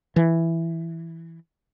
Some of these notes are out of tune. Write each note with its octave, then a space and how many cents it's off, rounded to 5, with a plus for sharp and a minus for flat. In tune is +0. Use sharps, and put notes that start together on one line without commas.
E3 +5